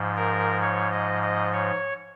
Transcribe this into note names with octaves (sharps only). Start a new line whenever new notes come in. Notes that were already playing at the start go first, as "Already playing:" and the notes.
Already playing: G#2 F3
A#4
C#5
D#5
D#5
C#5